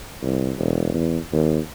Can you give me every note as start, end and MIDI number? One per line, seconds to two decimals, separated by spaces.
0.22 0.52 36
0.58 0.92 28
0.94 1.18 40
1.32 1.59 39